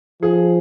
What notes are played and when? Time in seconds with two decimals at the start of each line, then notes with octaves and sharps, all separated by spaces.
0.22 F3 G#4